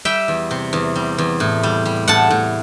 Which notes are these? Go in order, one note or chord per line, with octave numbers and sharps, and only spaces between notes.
G3 E5 G5
E2
C3
E2
G3
E2
A2
G3
G3
A2 F#5 A5
A2